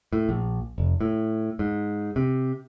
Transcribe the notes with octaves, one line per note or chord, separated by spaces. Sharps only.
A2
A#1
F1
A2
G#2
C3